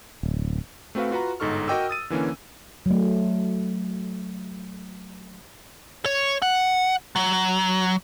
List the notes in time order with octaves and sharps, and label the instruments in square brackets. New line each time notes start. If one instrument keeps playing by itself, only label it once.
[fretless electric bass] D1
[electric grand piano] A3 C4 F#4 B4 F5
F4 F#4 B4 F#5 A#5
G1 G#2 D#4 A4 C#6 F6
F#4 A#4 D#5 G5 D6 E6
D#6 A6 D#7
D3 E3 A#3 C#4
[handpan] F#3 A3
[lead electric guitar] C#5
F#5
F#3